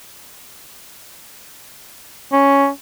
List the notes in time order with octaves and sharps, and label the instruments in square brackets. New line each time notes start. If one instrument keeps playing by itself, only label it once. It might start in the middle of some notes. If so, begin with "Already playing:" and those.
[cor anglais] C#4